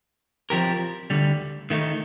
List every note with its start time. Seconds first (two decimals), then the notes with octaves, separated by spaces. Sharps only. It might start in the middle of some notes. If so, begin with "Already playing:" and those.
0.50 F3 C4 G4 A#4
1.10 D2 D3 G3
1.70 D#3 A3 D#4